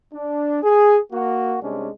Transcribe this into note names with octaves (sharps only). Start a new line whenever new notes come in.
D4
G#4
A#3 F#4
C2 C3 G#3 C#4 D4